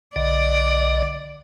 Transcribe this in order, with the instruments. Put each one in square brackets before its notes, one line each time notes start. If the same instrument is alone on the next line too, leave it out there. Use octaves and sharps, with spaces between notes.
[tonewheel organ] B1 D3 D#5 [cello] D5